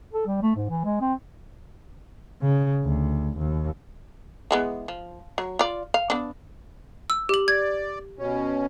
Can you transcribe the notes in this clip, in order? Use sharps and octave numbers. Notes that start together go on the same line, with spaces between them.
A4
G3
A3
G#2
E3
G#3
C4
C#3
D2
D#2
E3 G#3 B3
F3
F#3
F4 D5
F5
B3 D4
E6
G4 F#7
D5 G#6
B2 C#4